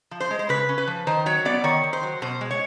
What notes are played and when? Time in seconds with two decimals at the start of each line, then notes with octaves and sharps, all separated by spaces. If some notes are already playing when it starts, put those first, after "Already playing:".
0.11 F3
0.20 C5
0.31 G#3
0.39 C5
0.49 C#3 B4
0.69 C#4
0.78 B4
0.87 F3
1.07 D#3 C5
1.26 F#3 C#5
1.45 B3 D5
1.64 D#3 C#5
1.84 D#3
1.93 C5
2.03 F#3
2.22 B2 C5
2.41 G#3
2.51 C#5